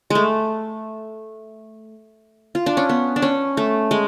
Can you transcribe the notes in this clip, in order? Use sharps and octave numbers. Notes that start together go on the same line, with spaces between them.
G#3 A3
F4
D4
C#4
B3
D4
C#4
A3
G#3